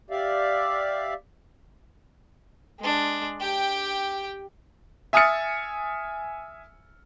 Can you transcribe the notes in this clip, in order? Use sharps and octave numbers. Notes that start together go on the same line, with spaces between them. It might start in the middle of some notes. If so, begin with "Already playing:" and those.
G4 D5 E5 F5
G#3 D4
G4 G5
E5 G#5 D#6 F6 A6 C#7